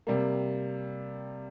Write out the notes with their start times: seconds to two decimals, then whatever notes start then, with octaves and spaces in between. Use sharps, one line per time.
0.07 C3 G3 A#3